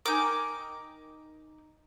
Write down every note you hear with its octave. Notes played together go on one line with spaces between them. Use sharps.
D#4 A#4 G5 G#5 D6